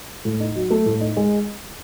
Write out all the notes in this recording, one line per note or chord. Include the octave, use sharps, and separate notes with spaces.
A2
D#4
F#3
A3
A2
D#4
G#3